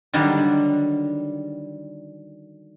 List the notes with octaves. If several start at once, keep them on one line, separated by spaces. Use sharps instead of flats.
D3 D#3 F#3 G3